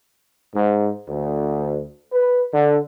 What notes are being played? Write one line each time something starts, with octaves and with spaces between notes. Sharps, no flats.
G#2
D2
B4
D3